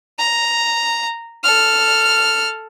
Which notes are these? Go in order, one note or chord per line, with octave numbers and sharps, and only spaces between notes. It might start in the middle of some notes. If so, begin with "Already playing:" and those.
A#5
A4 F6